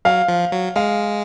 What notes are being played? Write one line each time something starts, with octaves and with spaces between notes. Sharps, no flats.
F#3 F5
F3
F#3
G#3 F5